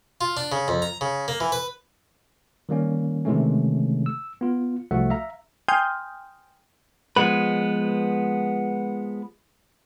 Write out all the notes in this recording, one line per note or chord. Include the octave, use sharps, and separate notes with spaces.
F4
D4
C#3
F2
A#5
C#3
A#3
E3
B4
D#3 G3 A#3 C#4
C3 D#3 E3 G#3 A3 C#4
E6
B3 F4
C2 F3 A3 F#4 E5 F#5
E5 F5 A#5
G5 G#5 C6 D#6 F6 G6
F3 G#3 B3 B4